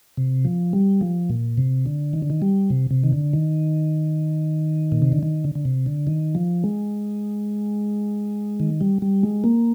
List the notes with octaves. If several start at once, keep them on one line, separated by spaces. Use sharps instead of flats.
C3
F3
G3
F3
A#2
C3
D3
D#3
D3
D#3
G3
C3
C3
D#3
D3
D#3
A#2
C3
D3
D#3
D3
D3
C3
D3
D#3
F3
G#3
D#3
G3
G3
G#3
A#3